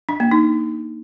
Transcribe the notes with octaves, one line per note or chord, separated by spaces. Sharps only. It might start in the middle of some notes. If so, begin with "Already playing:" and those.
D4
A#3
D#4